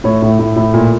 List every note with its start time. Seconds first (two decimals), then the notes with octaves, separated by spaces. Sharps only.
0.04 A2 C#5
0.22 A2
0.39 A2
0.56 A2
0.74 A#2